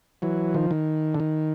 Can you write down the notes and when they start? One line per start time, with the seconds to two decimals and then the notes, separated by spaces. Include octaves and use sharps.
0.22 E3 F#3
0.54 D#3 F3
0.71 D#3
1.14 D3
1.20 D#3